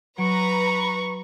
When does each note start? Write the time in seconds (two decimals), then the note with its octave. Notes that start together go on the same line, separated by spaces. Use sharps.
0.18 F#3 B4 A#5 C#6 D7